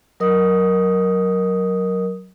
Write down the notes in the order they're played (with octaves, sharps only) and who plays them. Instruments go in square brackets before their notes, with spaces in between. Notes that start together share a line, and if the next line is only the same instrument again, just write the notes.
[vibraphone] F#3 A#4 D#5 D#6